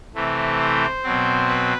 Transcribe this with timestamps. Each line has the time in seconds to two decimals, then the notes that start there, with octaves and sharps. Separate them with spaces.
0.15 C3 E3 A3 C4
0.60 C5
1.03 B2 F#3 C4
1.48 B4